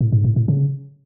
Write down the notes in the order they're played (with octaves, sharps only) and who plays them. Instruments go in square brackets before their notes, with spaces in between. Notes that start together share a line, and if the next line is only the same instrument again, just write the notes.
[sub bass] A2
G#2
A2
A2
C#3